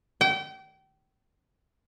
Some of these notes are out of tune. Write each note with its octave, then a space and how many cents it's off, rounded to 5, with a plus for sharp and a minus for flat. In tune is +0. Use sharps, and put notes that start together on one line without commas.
G5 -30